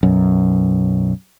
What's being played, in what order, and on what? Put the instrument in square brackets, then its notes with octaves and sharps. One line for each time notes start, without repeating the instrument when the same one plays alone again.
[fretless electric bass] B1 F#2